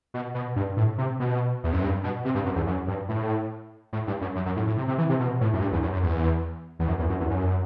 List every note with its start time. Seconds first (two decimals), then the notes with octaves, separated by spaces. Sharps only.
0.14 B2
0.34 B2
0.56 G2
0.77 A2
0.98 C3
1.20 B2
1.64 E2
1.73 F#2
1.83 G2
2.04 B2
2.25 C3
2.35 G2
2.45 F#2
2.56 E2
2.67 F#2
2.88 G2
3.09 A2
3.93 A2
4.07 G2
4.21 F#2
4.35 F#2
4.46 F#2
4.56 A2
4.67 A2
4.77 C3
4.88 C3
4.98 E3
5.09 C3
5.20 B2
5.41 A2
5.53 F#2
5.62 G2
5.72 E2
5.83 F#2
5.93 F#2
6.03 E2
6.79 E2
6.88 F#2
6.99 E2
7.09 F#2
7.20 E2
7.30 F#2